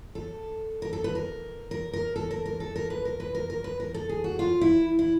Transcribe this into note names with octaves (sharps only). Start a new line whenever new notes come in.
A4
A#4
A4
B4
A#4
A#4
A#4
A4
A#4
A#4
A4
A#4
B4
A#4
B4
A#4
A#4
B4
A#4
A4
G#4
F#4
F4
E4
E4